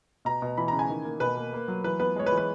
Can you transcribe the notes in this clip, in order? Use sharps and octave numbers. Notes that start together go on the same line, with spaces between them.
B2 A#5
B2
E3 B5
C#3 A#5
G#5
D#3
A#3
B2 B4
A#3
A#3
F#3
E3 B4
B3 B4
G#3 C#5
B4
E3
B4